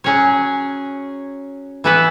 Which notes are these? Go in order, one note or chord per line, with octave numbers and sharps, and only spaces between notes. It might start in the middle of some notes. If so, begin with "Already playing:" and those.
F#3 C#4 G#4 C#5
E3 B3 E4 B4